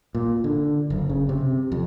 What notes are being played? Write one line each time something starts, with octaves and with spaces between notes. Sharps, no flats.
A#2
D3
F#1
C#3
C3
F2